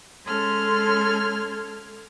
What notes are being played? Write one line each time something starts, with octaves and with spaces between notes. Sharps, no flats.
G#3 C#4 A4 C6 F6 G#6